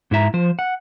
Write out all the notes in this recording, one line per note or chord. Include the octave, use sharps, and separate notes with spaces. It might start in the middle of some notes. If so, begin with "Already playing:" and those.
G#2 E4 E5 A#5
F3 C5
F#5